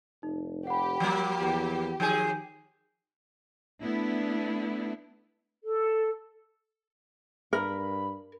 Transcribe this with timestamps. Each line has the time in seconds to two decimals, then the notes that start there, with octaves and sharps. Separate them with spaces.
0.23 F1 D#4
0.67 G4 F#5 B5
1.00 F3 G3 A#3
1.40 E2
2.00 D#3 F3 G#4 G#5 G6 D#7
3.81 A3 B3 D4 E4
5.63 A4
7.53 G2 A#4 B5